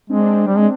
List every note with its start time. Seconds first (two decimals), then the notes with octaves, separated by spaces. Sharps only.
0.10 G#3 C4 D4
0.47 G3
0.57 G#3